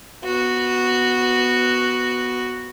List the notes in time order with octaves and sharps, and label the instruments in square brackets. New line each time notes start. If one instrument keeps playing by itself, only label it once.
[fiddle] B3 F#4